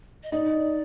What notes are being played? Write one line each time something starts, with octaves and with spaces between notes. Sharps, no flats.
D#5
D#4 D5